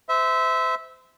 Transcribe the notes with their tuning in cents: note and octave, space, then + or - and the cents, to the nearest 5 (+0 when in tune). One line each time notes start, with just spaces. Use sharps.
C5 -30 E5 -15